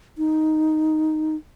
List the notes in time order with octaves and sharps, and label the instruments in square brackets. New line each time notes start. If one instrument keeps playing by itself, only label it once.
[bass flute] D#4